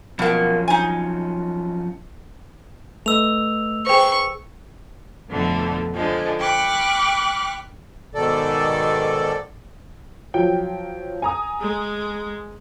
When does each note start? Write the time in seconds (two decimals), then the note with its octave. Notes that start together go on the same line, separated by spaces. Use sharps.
0.19 B2 F3 F#3 A#3 C#4
0.68 D#4 G#5
3.06 A3 B4 D#5 E6 F7
3.87 G#4 B4 C5 G5 C#6
5.29 F2 B2 D3 A3
5.94 D3 F3 G#3
6.40 G5 B5 C#6 D6 F6 F#6
8.15 G#2 B2 D#3 A4 D5
10.34 F3 F#3 G5
11.22 G#5 A#5 D#6
11.61 G#3